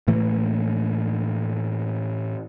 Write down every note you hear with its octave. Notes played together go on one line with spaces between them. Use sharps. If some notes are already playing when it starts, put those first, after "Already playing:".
A2 E3 A3 A#3